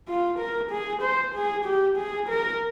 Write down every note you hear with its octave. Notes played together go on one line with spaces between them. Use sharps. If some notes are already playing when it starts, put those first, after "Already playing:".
F4
A#4
G#4
C5
G#4
G4
G#4
A#4